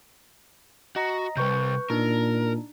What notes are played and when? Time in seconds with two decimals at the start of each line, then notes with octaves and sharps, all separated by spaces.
0.96 F#4 D#5 A#5 A#6
1.37 C3 G3 B4 C#6 G6
1.90 A#2 D4 D#4 A#4